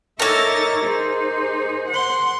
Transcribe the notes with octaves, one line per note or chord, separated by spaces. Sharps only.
A#3 D#4 A4 A#4 C#5 E5 A6 A#6
D#4 G#4 C5
F#5 C6